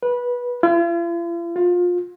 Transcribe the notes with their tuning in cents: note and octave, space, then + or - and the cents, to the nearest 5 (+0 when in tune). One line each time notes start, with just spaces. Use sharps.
B4 -15
F4 -45
F4 +25